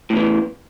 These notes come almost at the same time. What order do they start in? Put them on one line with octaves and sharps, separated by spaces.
A2 E2 E3